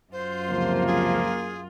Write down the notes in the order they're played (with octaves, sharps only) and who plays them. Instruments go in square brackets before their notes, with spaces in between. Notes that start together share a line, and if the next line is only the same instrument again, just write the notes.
[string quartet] F#2 F4 [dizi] C5
[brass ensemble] C#2 C3 F3 [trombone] A#3
[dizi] G#4